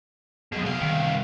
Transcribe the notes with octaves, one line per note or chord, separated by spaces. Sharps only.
F#2 B2 G#4
C2 F5
D#3